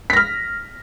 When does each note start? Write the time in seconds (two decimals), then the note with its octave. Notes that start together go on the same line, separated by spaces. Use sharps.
0.10 B6
0.13 A#6
0.17 F6